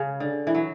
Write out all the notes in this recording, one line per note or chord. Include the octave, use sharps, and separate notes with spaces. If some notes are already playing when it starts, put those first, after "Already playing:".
Already playing: C#3
D3
E3
F#3